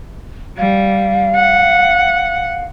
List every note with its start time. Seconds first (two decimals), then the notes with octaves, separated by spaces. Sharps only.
0.58 G3 F5
1.36 F#5